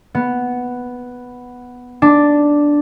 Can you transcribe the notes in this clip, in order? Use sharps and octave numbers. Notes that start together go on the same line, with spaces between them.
B3
D4